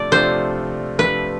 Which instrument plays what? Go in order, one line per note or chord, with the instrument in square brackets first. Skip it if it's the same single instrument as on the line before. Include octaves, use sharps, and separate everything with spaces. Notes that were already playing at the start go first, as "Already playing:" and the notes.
Already playing: [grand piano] C3 F3 A3 D4 F4 [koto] D5
[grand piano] C3 F3 A3 D4 F4 [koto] C5
[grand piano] C3 F3 A3 D4 F4 [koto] B4